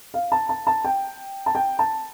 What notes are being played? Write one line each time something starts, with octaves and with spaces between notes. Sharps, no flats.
F5
A5
A5
A5
G5
A5
G5
A5